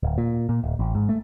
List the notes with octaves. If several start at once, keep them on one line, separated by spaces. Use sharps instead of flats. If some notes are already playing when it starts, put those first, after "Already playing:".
D1
A#2
A#2
D1
A1
G#2
A3